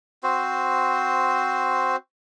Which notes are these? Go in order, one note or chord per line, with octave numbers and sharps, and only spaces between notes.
C4 F#4 C5